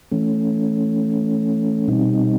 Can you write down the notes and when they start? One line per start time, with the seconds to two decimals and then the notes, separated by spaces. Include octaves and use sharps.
0.12 E3 A3 C#4
1.88 B2 G3 C4 D#4